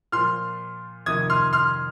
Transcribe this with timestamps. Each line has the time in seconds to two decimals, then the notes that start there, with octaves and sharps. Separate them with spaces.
0.12 A#2 F3 C6 F6
1.06 F2 C3 D#3 D#6 G#6
1.30 C6 F6
1.53 C6 F6